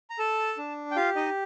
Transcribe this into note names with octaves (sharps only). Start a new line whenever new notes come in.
A#5
A4 A5
D4
G5
F4 G4 F5
D#4 D#5